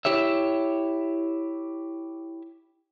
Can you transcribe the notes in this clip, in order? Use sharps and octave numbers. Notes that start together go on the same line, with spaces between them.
E4 G4 C#5 E5